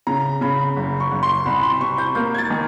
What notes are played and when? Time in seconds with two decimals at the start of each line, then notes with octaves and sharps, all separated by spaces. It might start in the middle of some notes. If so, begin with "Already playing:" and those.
0.07 C#3 A#5
0.41 C#3 B5
0.76 F#1
1.00 C#6
1.11 F#1
1.23 C6
1.46 C2 B5
1.63 C6
1.80 C3 C#6
1.98 G6
2.15 A#3 G6
2.34 G#6
2.38 A6
2.50 D#3